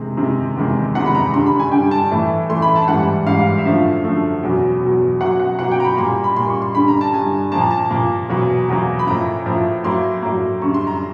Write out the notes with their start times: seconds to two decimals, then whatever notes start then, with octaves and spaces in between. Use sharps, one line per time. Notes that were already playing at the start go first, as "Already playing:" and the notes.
Already playing: C3 D#3 G#3
0.17 C3 D#3 G#3
0.56 E2 C3 D#3 G#3
0.95 E2 C3 D#3 G#3 F#5
1.06 B5
1.15 A#5
1.33 G2 D3 G3 C6
1.46 B5
1.59 G#5
1.72 G2 D3 G3 G5
1.91 A5
2.11 A2 E3 A3
2.49 A2 E3 A3 C6
2.62 B5
2.76 A5
2.88 G#2 E3 G3 F#5
3.26 G#2 E3 G3 F5
3.58 E5
3.65 F#2 D3 F3 A3 F5
4.04 F#2 D3 F3 A3
4.43 E2 B2 F#3
4.81 E2 B2 F#3
5.20 B2 F#3 A#3 F#5
5.40 F#5
5.59 B2 F#3 A#3 F#5
5.72 G5
5.80 A#5
5.84 B5
5.97 A#2 G3 A#3 C6
6.24 B5
6.36 A#2 G3 A#3 C6
6.49 C#6
6.62 C6
6.75 G2 D3 G3 B5
6.88 A#5
7.01 A5
7.13 G2 D3 G3 G#5
7.52 A#2 F3 A#3 A5
7.61 A#5
7.71 A5
7.91 A#2 F3 A#3
8.29 E2 B2 F#3 A#3
8.69 E2 B2 F#3 A#3
8.99 B5
9.07 A2 F3 A#3 A#5
9.46 A2 F3 A#3
9.84 A2 F#3 A#3 C6
10.22 A2 F#3 A#3
10.62 F#2 D3 G3 C#6
10.74 C6
10.87 A#5